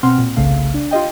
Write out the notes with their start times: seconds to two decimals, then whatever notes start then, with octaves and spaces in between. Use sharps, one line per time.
0.03 B2 C4 F#5 C6 F6
0.18 A#2
0.37 G1 C2 C#3 A3 F5
0.74 D4
0.91 F4 G4 D#5 G5